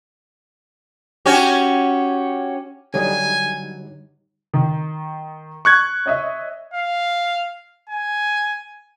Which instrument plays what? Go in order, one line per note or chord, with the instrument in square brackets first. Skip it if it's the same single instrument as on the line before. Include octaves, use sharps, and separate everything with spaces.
[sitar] C#4 F#4 G4
[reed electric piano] D3 G3 D#4 [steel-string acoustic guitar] F#3 [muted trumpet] G#5
[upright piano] D#3
[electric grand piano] C#6 F#6 G#6
[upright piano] C#5 D#5 E5
[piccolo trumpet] F5
G#5